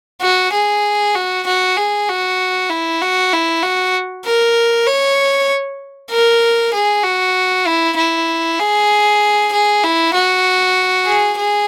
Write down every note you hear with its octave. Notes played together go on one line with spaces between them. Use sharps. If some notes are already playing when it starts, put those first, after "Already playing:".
F#4
G#4
F#4
F#4
G#4
F#4
E4
F#4
E4
F#4
A#4
C#5
A#4
G#4
F#4
E4
E4
G#4
G#4
E4
F#4
G#4
G#4